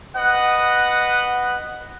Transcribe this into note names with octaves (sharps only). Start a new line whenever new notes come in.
B4 D#5 F#5